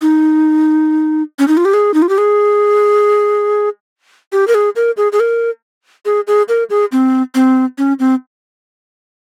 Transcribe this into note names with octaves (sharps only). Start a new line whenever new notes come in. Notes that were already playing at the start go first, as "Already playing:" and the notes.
D#4
C#4
D#4
F4
G4
G#4
D#4
F4
G4
G#4
G4
A#4
G#4
A#4
G#4
G#4
A#4
G#4
G#4
A#4
G#4
C4
C4
C#4
C4